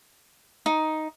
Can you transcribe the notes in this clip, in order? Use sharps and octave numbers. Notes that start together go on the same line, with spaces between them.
D#4